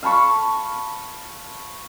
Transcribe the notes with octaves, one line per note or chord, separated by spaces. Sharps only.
F5 A5 B5 C#6